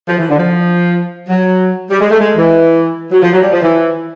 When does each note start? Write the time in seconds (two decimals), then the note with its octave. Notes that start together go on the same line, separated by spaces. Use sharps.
0.08 F3
0.18 E3
0.29 D3
0.38 F3
1.29 F#3
1.90 G3
2.01 G#3
2.11 A3
2.20 G#3
2.36 E3
3.11 F#3
3.22 F3
3.33 F#3
3.42 G3
3.52 F3
3.62 E3